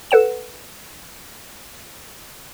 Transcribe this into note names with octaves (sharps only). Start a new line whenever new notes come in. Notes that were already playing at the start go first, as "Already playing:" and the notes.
A4 B4 F#5 E7